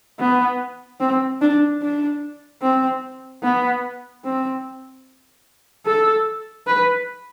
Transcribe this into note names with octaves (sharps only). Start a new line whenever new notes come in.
B3
C4
D4
D4
C4
B3
C4
A4
B4